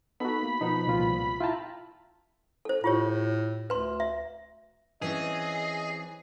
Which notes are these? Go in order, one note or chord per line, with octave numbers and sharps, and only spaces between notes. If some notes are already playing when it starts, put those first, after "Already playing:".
B3 D#4 F#4 A4 B5
A#3
B2 F3 B3 D#4
C2 A#2 F4
E4 F4 E5 G5 A5 A#5
A4 C5
A2 F4 G4 C#5
D2 B4 C6
E5
E3 C4 C#4 G#4 D#5